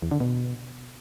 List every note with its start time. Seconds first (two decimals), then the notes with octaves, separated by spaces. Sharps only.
0.02 E2
0.11 D3
0.20 B2